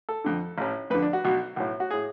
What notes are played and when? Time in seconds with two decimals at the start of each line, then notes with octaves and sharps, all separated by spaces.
0.09 A4
0.24 F2 D3
0.58 A1 A2
0.90 F2 B4
0.94 D3
1.02 D4
1.13 F#4
1.24 B1 B2
1.56 B1 A2
1.80 F#4
1.90 A2 G#4